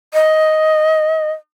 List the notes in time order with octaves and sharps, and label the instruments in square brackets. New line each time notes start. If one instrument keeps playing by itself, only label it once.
[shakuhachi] D#5